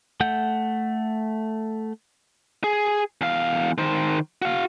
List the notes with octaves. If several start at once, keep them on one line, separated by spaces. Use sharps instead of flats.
A3 F#5 G6
G#4
E2 F5
D#3 C5
F#4 F5